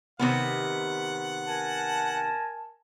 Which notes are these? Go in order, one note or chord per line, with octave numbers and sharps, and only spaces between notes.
C3 D#3 B3 F#5
A#4 G#5 A5